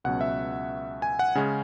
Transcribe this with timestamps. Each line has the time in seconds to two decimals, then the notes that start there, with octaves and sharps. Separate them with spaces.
0.04 C#2 B2 F#3 C#4 F#5
0.21 E5
1.02 G#5
1.19 F#5
1.35 C#3 G#3 C#4 G#5